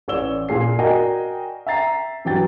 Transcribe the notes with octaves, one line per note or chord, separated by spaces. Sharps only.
A1 E3 C#5 D5 E6 G7
A#2 G#4 C7
F#4 A#4 D5 D#5 G5 G#5
E5 G5 A#5 A6 C7
G2 E3 F#3 G5 A6